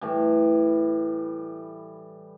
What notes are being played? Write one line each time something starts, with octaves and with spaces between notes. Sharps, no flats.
A2 E3 G3